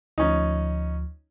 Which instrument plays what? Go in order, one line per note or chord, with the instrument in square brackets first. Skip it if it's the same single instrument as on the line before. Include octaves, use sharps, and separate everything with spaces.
[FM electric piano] D2 F3 [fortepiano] C#4 D#4